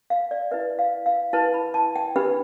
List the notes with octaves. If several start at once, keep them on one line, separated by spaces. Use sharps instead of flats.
F5
D5
E4 B4 E5
F5
F5
E4 B4 A5
B5
A5
G5
D4 G4 B4 B5